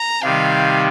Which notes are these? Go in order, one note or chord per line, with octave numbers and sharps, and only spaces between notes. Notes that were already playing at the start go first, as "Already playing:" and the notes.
Already playing: A#5
C3 D#3 G3 F5